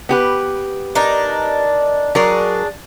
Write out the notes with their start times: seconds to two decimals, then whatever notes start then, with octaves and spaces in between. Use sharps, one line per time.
0.09 B3 G4 B4
0.95 D4 D#4 A#4
2.15 F#3 D4 G#4 A#4